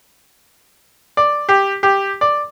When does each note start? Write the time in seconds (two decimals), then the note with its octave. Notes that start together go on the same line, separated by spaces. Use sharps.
1.17 D5
1.49 G4
1.83 G4
2.21 D5